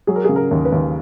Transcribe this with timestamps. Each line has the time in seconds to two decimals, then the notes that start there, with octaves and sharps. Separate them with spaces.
0.07 F#3 G#4
0.16 A#4
0.25 C#3 G#4
0.36 A#4
0.51 D#2
0.65 B4
0.72 D#2